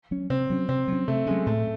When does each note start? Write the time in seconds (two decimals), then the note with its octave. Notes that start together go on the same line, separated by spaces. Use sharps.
0.11 F#3 C#4
0.30 C3 C4
0.50 F#3 C#4
0.68 C3 C4
0.88 F#3
0.93 C#4
1.08 C3 A3
1.26 G#3 C#4
1.31 F#3
1.46 A2 A3